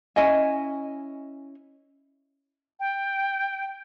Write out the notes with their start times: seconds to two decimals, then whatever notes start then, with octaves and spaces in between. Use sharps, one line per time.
0.16 C#4 E4 D#5 G#5
2.80 G5